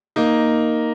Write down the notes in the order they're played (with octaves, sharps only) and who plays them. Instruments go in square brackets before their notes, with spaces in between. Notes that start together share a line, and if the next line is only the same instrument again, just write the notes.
[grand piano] A#3 D#4